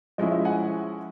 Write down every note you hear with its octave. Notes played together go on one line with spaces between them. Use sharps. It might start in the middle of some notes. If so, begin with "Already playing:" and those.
F3 G#3 C#4 E4 D#5
E5
F#5 G#5